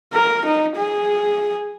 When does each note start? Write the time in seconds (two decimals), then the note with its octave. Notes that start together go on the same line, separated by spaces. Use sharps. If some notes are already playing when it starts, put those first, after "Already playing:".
0.14 A#4
0.45 D#4
0.76 G#4